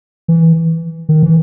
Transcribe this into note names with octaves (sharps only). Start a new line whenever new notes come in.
E3
D#3
E3